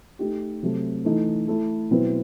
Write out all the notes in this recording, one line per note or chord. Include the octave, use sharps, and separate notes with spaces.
A3 D#4 G4
C3 F#3 A3
E3 A3 D#4
A3 E4 A4
B2 F#3 C4 E4 B4